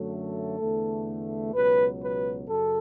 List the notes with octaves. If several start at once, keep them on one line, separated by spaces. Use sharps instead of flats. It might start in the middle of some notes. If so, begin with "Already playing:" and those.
Already playing: F#2 D3 F#3 A3
A4
E2 D3 A3
C#2 B2 F#3 B4
B4
F#2 C#3 A4